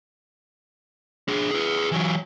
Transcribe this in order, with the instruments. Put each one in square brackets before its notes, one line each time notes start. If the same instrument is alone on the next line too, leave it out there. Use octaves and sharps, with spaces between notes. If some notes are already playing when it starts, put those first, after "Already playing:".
[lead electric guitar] D4 G#4
G#4 B4
E3 F#3